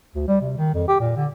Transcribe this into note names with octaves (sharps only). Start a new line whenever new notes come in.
D2
G3
C3
D#3
F2
G4
A#2
D3